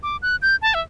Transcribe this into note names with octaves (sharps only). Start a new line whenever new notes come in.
D6
F#6
G6
A5
E5